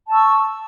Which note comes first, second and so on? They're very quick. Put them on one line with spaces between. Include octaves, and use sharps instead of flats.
A5 E6 C#6